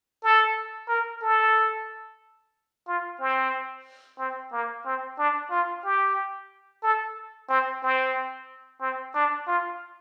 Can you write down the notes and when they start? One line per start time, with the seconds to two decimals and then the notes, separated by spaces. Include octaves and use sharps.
0.23 A4
0.89 A#4
1.22 A4
2.87 F4
3.20 C4
4.19 C4
4.53 A#3
4.85 C4
5.18 D4
5.51 F4
5.84 G4
6.83 A4
7.49 C4
7.83 C4
8.81 C4
9.15 D4
9.48 F4